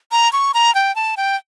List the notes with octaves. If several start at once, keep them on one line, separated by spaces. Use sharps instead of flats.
A#5
C#6
A#5
G5
A5
G5